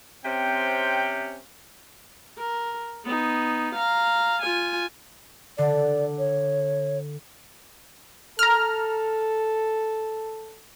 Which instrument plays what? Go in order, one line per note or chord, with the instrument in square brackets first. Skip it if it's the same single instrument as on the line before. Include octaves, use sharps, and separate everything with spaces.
[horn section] C3 C4 C#4 G5
[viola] A#4
B3 D#4
F5 A#5
F4 G#5
[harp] D3 [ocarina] D5
[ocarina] C#5
[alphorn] A4 [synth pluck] A#5 F6